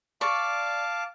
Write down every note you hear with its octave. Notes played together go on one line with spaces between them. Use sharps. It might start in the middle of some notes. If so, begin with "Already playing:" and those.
D5 F5 A5 C#6 D6